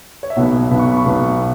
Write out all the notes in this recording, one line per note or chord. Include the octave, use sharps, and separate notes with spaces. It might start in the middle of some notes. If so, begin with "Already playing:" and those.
C#5
E5
B1 B2 B3 F#5
B1 B2 B3 B5
C#6
B5
C#6
B1 B2 B3